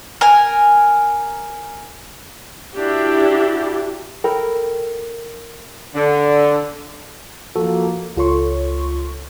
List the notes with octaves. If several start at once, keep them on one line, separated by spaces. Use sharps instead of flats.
A#4 G#5
D4 E4 F#4 G4
A4 A#4 G5 B5
D3
F3 A#3 F#4 A4
C#2 F4 A4 C#5 C6 C#6